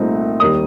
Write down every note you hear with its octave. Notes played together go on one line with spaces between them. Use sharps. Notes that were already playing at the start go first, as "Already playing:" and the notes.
Already playing: C2 A#2 A3 C4 D#4
D#2 D#3 G3 D#6